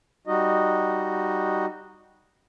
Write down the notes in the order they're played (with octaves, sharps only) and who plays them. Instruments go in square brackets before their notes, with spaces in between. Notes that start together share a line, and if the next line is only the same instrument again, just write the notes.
[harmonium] G3 D#4 F#4 D#5